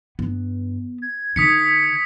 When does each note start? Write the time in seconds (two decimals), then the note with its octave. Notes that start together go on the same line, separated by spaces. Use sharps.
0.19 G2 B3
1.02 G#6
1.36 D3 D#4 D#6 B6 C#7